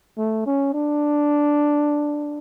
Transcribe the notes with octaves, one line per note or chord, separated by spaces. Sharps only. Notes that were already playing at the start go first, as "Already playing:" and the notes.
A3
C#4
D4